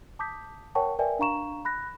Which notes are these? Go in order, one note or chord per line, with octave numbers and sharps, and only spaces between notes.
A5 D6 D#6 G6 B6
A#4 C#5 F#5 G5 A5 C#6
A#4 B4 D5 E5 G5 G#5
D4 F5 A#5 C#6 E7
B5 F#6 A#6